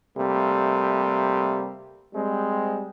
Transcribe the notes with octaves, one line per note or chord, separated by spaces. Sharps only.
C3 G3 A3 A#3
G3 G#3 C4